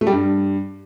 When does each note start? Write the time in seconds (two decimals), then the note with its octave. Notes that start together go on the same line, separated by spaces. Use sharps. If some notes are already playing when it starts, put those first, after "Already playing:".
0.01 A3
0.07 G3
0.12 G2